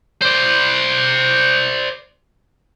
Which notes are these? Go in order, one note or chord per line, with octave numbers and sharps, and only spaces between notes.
C5 D5